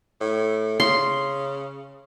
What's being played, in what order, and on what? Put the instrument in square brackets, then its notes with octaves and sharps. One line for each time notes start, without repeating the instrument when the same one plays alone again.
[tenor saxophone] A2
[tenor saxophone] C#3 [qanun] C6